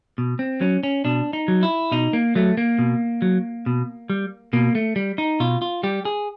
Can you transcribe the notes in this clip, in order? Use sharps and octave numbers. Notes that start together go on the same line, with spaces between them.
B2
C4
F#3 C#4
C#4
B2 D4
D#4
F#3
E4
B2 D#4
A#3
F#3 A3
A#3
B2
F#3
B2
G3
B2 A#3
A3
G3
D#4
B2 F4
F4
G3 G4
G#4